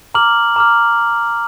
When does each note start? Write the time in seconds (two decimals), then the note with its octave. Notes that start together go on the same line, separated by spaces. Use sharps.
0.15 A#5 D6 F6 F#7
0.56 A#5 D6 F6